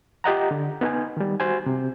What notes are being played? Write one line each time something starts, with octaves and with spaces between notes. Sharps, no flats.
F4 G4 D#5 F#5 A#5
D3
B3 D#4 B4 G#5
D#3 G3
F#4 C5 G#5
C3